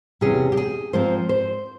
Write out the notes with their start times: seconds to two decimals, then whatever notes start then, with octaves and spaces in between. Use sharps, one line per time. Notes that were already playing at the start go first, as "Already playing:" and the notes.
0.21 E2 C3 G3 C#4 G#4
0.52 G4
0.57 G#4
0.93 G#2 F3 C4 C5
1.29 C5